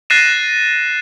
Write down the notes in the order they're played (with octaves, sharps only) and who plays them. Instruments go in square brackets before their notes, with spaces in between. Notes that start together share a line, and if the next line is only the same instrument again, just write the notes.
[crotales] F#6 A6 A#6 C7 D#7 E7